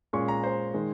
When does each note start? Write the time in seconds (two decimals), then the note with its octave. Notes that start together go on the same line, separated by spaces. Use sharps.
0.13 A#2 G#3 C#4 C#6
0.28 A#5
0.44 C5
0.74 D#3 G#3